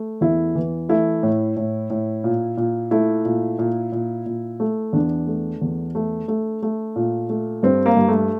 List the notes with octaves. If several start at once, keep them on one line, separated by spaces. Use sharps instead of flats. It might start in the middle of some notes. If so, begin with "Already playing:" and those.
Already playing: A3
E2 E4
E3
A3 E4
A2
A2
A2
A#2
A#2
A3 E4
A#2
A#2
A#2
A#2
A3
E2 D4
A3
E2
A3
A3
A3
A#2
A3
G2 C4
A#3
G2
A3